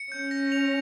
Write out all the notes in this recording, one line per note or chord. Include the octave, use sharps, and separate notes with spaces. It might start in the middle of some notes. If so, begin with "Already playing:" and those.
Already playing: C#7
C#4 G6
A#6
F7